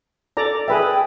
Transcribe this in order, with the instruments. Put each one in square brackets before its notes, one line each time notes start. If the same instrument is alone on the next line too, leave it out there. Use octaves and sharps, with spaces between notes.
[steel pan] A4 D5 A#5
[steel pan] G#4 B4 E5 [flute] G5